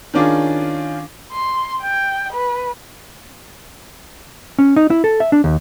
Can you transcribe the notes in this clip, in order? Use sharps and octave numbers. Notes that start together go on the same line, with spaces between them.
D#3 C#4 D4 F4 G#4
C6
G5
B4
C#4
D#4
E4
A4
E5
D4
D#2